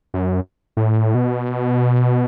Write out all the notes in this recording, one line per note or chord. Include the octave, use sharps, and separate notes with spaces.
F#2
A2
B2